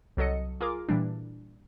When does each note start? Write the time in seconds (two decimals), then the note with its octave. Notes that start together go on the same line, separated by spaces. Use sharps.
0.17 C2 F#3 A4 D#5 C#7
0.61 F4 G#4 A#4 D6
0.89 A#2 E3 G3 D4